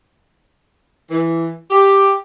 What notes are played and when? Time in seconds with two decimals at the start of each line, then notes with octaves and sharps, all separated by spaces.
1.11 E3
1.70 G4